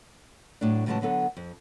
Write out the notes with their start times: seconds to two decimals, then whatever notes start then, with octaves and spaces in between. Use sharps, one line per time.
0.61 A2 F#3 A3 D4
0.86 A2 C#3 E3 F#3 G#3 A5
1.01 D3 F#3 B3 A4
1.37 F2